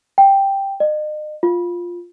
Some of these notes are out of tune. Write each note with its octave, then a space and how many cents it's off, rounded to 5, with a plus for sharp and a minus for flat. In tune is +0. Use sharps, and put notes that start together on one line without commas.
G5 +0
D#5 -40
F4 +5